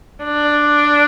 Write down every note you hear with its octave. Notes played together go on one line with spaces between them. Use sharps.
D4